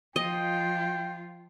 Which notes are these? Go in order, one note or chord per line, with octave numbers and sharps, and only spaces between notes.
F3 F4 D#5 G5